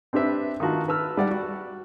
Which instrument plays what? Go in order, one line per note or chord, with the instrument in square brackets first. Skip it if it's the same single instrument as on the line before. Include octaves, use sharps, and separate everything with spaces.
[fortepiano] C4 D4 G4 B4 E5
D#3 F4 F#4 A5
B4 A5 E6 F6
G3 D5 F#5
F#4